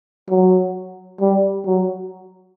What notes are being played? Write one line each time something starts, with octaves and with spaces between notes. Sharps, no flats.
F#3
G3
F#3